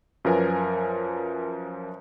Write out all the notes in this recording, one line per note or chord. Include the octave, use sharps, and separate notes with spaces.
F#2 F3 A#4 B4 G#5